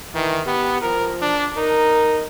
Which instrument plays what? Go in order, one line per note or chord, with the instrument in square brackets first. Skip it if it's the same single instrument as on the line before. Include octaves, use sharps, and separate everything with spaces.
[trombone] D#3 [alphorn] E3
[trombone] B3 [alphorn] G4
[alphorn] F3 [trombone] A#4
[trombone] D4
[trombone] D#4 [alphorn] A#4